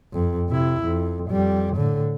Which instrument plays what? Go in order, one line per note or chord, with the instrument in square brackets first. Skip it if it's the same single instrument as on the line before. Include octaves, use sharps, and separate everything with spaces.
[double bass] F2
C3 E4
F2
F2 G3
A2 D3